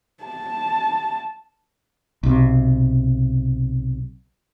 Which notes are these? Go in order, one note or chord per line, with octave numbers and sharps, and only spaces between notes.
A5
B1 C3